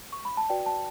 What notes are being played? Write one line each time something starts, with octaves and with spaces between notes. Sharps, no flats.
C#6
B5
A5
F#4 B4 D5 G5
A5